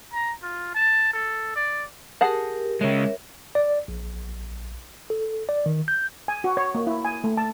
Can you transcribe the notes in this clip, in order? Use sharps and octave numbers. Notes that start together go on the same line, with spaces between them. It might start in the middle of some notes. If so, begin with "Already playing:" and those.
A#5
F4
A5
A4
D5
G4 G#4 A#4 F#5 A5
C#3 G#3 A#4 C#5 E5
D5
A#1
A4
D5
D#3
G6
G#5
F#4
C#5
A#3
E4
G#5
A3
A5